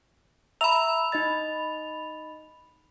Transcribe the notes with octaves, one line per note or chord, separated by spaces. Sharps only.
E5 A#5 B5 E6 F7
D#4 D#5 A6